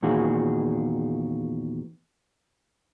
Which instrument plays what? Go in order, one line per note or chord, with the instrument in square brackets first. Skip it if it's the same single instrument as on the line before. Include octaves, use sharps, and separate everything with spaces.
[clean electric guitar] E2 A#2 D#3 F#4 G#4